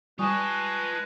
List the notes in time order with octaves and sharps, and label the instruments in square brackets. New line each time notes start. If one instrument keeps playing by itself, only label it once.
[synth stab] G3 [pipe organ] G#3 B4 [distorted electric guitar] F4 A5 [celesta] G#5 C#6 D#6